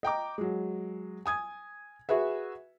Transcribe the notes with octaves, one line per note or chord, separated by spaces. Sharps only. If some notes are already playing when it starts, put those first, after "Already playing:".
D#5 G5 A#5 D6
F#3 G#3
G#5 D#6 G#6
F#4 G#4 B4 E5